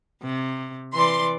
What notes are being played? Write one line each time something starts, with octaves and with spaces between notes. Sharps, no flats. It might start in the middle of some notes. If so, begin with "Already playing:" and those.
C3
E3 D5 C6